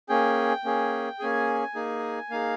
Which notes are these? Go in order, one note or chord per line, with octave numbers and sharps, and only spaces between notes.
A#3 C#4 G#4 G5
A#3 C#4 G#4
A#3 C#4 G#4 G#5
A#3 D#4 G#4
A#3 D#4 G#4 F5